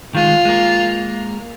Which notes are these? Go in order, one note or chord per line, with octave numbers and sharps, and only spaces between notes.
D#3 G#3 F4
G#3 A#3